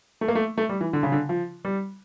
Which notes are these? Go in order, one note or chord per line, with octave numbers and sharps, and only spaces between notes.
A3
A#3
A3
A3
G3
E3
D3
C#3
D3
F3
G3